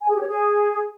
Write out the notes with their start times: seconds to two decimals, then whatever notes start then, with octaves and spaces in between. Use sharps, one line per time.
0.02 G#5
0.09 G#4
0.15 G4
0.21 C#5
0.27 G#4